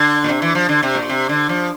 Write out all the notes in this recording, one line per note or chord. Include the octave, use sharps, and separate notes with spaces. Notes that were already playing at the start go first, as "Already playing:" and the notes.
Already playing: D3
A#2
C3
E3
F3
D3
C3
A#2
C3
D3
F3